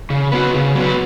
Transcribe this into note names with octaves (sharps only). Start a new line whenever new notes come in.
C#3
F#3 B3 F#4 B4
C#3
F#3 B3 F#4 B4